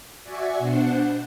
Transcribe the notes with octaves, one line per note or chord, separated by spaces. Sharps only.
F#4 D5 E5 G#5 C#6
B2 D4 C5 F#5